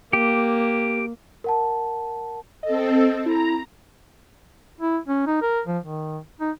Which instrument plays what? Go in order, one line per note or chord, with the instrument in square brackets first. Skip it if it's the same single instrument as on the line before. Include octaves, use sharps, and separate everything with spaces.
[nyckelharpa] A#3 [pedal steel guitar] G4
[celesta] A#4 F#5 A5
[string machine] C4 A4 [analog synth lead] D#5
[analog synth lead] E4 [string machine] A#5
[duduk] E4
C#4
D#4
A#4
F3
D#3
D#4